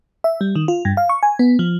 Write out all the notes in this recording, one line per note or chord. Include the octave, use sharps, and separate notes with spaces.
E5
G3
D#3
F4
G2
F5
C#6
G#5
B3
F3